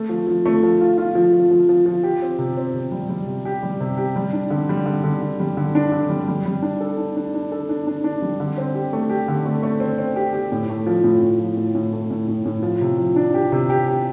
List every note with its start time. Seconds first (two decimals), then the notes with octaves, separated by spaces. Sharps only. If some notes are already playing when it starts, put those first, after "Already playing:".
Already playing: A3
0.09 F3
0.27 F3
0.46 A3
0.63 F3
0.81 F4
0.98 F4
1.15 F3
1.33 F3
1.51 F3
1.69 F3
1.86 F3
2.03 G4
2.22 C4
2.39 C3
2.57 C4
2.74 C3
2.92 G3
3.09 G3
3.27 C3
3.45 G4
3.63 G3
3.80 C3
3.97 G4
4.16 G3
4.33 D4
4.50 D3
4.69 G3
4.86 D3
5.04 D3
5.21 D3
5.40 G3
5.57 D3
5.75 D4
5.92 D3
6.10 G3
6.28 G3
6.45 G3
6.62 D4
6.80 A4
6.98 D4
7.16 D4
7.34 D4
7.52 A4
7.69 D4
7.87 D4
8.04 D4
8.22 G3
8.40 D3
8.58 C4
8.74 G4
8.93 A3
9.09 G4
9.28 D3
9.46 A3
9.63 A3
9.80 C4
9.98 C4
10.16 G4
10.33 G4
10.52 A2
10.69 A3
10.87 F3
11.04 A2
11.22 A2
11.39 F3
11.57 A2
11.75 A2
11.93 A3
12.11 A2
12.28 A2
12.46 A2
12.63 F3
12.81 C3
12.98 F3
13.16 D4
13.34 G4
13.52 C3
13.70 G4
13.87 G4